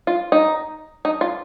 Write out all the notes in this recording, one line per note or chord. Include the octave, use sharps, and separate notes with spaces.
F4
D#4
D#4
F4